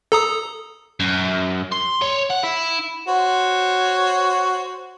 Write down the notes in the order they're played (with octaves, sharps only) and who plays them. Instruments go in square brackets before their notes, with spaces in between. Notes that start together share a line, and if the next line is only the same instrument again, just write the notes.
[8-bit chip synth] A4 A#5 D#6
[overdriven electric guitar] F#2
C6
C#5
F#5
E4
[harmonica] F#4 C5 C#5